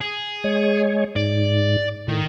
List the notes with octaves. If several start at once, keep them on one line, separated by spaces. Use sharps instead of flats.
G#4
G#3 C#5
G#2 D5
A2 D#3